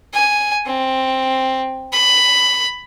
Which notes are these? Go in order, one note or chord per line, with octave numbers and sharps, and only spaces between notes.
G#5
C4
B5